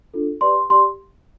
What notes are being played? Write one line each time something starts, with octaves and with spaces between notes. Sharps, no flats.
D4 F4 A4
G4 B4 D5 C6
G4 D5 C6